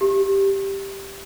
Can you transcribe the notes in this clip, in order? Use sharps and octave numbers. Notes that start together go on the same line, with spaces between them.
G4